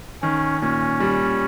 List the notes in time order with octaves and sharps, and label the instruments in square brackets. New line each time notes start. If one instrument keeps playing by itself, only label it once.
[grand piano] D#3 [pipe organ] C#4
[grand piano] A#2 [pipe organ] C#4
[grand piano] G3